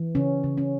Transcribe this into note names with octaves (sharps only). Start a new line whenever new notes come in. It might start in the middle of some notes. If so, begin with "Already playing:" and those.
Already playing: E3
C#3 C#4
C#3
C#4